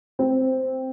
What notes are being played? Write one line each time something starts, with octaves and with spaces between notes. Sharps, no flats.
C4